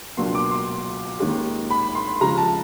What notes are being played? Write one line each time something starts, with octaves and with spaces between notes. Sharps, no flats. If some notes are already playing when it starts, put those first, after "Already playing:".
C#2 B2 F#3 A#3 D4 C6
D6
C6
D#2 D#3 G#3 C#4
B5
C6
C#3 F3 G#3 A#5
A5